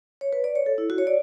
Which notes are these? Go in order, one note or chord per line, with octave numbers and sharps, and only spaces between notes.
C#5
B4
D5
C#5
A4
E4
F#4
C#5
D5